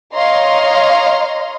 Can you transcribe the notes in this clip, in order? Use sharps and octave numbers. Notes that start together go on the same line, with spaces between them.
C#5 D#5 F5 A#5 C6